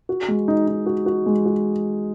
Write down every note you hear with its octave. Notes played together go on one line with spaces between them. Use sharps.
F#4
G#3
D#4
D#4
F#4
F#4
G#3
F#4